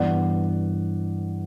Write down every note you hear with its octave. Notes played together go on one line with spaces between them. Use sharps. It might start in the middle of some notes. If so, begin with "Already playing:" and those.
Already playing: G2 E3 B3 D5 F#5